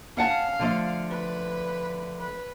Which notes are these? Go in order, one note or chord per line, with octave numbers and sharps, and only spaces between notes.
C#4 F5 F#5 A5
D3 F3 A3
B4
B4